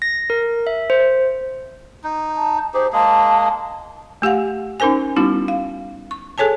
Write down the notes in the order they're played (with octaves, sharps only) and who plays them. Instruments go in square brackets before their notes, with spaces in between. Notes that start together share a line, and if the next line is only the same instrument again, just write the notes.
[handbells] A#6
A#4
E5
C5
[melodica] D#4
[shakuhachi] A5
[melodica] D#4 G4 G#4 [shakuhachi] C5
[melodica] G#3 A#3 G#4 [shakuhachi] A5
[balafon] A3 G4 F5 F#5
C#4 D#4 A#4 C5 G#5
G3 B3 C#4 D#4 E4 F#4
F5
C#6
G#4 A4 C#5 G#5 A5